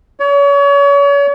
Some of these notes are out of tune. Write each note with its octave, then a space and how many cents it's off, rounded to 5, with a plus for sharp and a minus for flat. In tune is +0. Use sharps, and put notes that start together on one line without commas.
C#5 +35